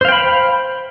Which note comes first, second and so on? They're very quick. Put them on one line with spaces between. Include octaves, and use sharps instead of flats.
C5 F5 G5 B5